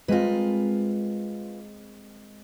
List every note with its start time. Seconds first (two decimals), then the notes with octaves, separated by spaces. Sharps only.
0.08 G#3 C4 F4 A#4 B4